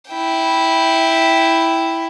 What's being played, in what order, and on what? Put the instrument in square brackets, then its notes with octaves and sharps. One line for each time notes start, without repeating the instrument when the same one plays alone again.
[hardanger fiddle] E4 G5